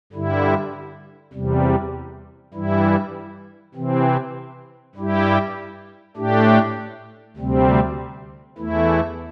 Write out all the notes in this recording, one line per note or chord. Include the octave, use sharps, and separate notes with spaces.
G2 D3 G3 E4
E2 C3 G3
G2 E3 G3 E4
C3 E3 C4
G2 G3 E4 G4
A2 A3 D4 G4
D2 C3 G3 C4
E2 E3 A3 E4